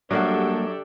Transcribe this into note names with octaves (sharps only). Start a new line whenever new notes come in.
F#2 G3 A#3 D4 F#4 G4 A4